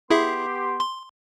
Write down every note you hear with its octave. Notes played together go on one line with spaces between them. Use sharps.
B3 E4 G4 G#4 E5 C6
C6